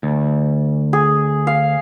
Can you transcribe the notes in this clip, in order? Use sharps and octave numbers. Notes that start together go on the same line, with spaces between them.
D2
G#4
F5